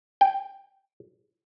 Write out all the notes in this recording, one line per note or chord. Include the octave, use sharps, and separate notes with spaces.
G5